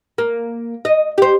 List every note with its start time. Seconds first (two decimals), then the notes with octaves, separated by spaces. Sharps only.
0.18 A#3
0.85 D#5
1.18 G4 C5